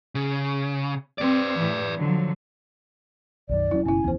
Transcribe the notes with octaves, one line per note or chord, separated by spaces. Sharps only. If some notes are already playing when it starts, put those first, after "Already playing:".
C#3
C4 B4 D5
A2 E3
D3 F3 F#3
B1 F#2 D#3 D5
E1 F#3 C#4 E4
F#1 B2 C#4 E4 G#5
F1 D#2 E3 B3 C5